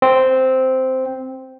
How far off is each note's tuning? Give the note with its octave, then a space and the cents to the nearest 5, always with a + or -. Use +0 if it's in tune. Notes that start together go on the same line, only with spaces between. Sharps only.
C4 -5